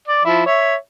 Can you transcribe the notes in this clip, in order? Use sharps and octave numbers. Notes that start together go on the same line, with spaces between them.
D5
F3 E4
C#5 E5